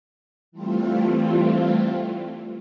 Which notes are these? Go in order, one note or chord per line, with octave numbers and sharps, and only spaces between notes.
E3 G3 A3 C4 F4